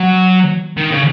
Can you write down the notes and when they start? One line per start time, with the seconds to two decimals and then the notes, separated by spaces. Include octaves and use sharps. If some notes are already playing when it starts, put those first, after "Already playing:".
Already playing: F#3
0.78 D#3
0.92 C#3